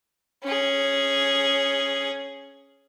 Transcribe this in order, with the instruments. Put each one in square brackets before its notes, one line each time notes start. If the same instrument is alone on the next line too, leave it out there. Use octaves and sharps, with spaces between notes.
[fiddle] C#4 G#4